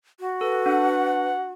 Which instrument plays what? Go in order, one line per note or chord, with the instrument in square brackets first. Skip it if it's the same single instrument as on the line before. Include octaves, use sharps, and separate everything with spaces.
[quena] F#4
[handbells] A4 [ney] B4
[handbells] D4 [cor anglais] F#5